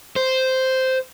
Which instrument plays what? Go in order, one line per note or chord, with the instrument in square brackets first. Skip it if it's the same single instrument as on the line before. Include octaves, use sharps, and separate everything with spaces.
[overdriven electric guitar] C5